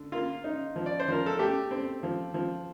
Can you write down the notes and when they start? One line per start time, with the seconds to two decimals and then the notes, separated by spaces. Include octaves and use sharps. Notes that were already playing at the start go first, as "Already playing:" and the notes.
Already playing: D3
0.12 A#3 F4
0.44 D#4
0.76 F3
0.86 D5
0.99 C5
1.08 F3 A#4
1.26 A4
1.39 A3 G4
1.71 C4
2.03 F3
2.34 F3